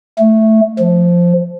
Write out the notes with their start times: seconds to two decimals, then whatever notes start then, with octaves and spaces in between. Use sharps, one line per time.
0.19 A3
0.80 F3